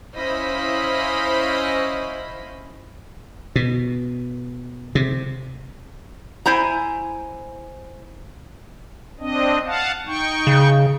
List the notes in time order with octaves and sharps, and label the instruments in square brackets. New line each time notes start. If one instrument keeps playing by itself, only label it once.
[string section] C#4 E4 C5 D#5 F5 B5
[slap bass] B2
C3
[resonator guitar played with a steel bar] E4 C5 G#5 A#5
[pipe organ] C4 D4 D#5
F5 F#5 A5
D#4 G5 C#6
[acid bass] C#3